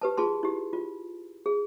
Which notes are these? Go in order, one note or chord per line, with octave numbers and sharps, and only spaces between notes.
G4 B4 A5
F4 G#4 A5 C6
E4 G4
F4
G#4